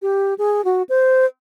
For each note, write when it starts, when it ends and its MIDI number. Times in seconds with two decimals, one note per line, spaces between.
0.02 0.34 67
0.38 0.64 68
0.65 0.83 66
0.89 1.26 72